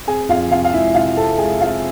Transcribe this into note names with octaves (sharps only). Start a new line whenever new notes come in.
C4 G#4 G#5
F2 F4 F5
C3 F4 F5
F5
G#3 E4 E5
E5
C3 F4 F5
C4 A4 A5
G#3 G#4 G#5
C4 F4 F5